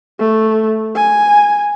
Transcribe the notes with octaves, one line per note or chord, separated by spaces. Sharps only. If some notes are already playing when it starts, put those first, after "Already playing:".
A3
G#5